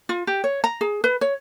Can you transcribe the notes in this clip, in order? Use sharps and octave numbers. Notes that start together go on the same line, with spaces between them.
F4
G4
C#5
A#5
G#4
B4
C#5